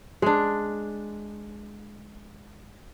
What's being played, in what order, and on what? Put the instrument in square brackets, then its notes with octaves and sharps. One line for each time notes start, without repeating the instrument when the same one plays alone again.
[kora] G#3 D4